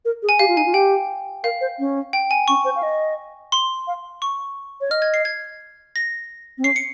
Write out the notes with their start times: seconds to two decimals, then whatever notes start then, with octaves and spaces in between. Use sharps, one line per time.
0.05 A#4
0.23 G#4
0.29 G#5
0.39 G4 F5
0.48 F4
0.57 D#4 G#5
0.66 F4
0.74 G4 G5
1.44 A#4 F5
1.61 C5
1.79 C#4
2.13 G5
2.31 G#5
2.48 C#4 C#6
2.65 C5
2.76 F5
2.83 D#5
3.52 C6
3.87 F5
4.22 C#6
4.81 C#5
4.91 D#5 F6
5.02 G#6
5.14 C7
5.25 G#6
5.96 A#6
6.58 C4
6.64 C#4 C7
6.76 C#7